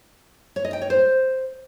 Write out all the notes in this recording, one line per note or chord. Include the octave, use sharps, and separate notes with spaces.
C#5
D#5
G5
C#5
C5